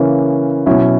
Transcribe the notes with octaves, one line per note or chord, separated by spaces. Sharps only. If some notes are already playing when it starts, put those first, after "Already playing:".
Already playing: C#3 E3 A#3 C#4
B2 F#3 C#4 E4